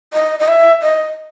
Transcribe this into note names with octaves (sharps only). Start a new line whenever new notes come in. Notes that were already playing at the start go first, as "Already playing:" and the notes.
D#5
D#5
E5
D#5